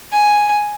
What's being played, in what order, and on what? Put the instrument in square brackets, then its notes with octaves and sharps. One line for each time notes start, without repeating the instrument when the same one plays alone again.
[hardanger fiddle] G#5